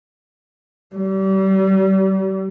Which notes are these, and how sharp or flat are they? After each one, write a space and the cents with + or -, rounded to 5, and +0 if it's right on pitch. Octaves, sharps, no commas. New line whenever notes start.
G3 -35